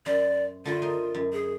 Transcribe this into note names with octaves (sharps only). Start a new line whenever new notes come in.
F#2 C5 D5
D3 E4 F4 D5
A#4 C5 D#5
F#2
G#4